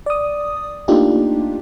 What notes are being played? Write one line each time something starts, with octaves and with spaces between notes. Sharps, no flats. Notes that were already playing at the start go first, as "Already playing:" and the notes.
D5 D#6
A3 A#3 D4 D#4 F4 G4